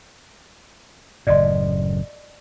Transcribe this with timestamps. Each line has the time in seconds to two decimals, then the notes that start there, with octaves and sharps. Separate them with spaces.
1.27 F#1 A2 D5 D#5 C6